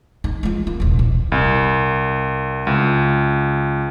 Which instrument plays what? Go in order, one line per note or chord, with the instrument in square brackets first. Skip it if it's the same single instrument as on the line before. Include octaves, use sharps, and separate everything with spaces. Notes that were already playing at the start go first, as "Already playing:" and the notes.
[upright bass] D#4
G#3 F4
A#3
D#1 C2
B2
[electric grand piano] C2
C#2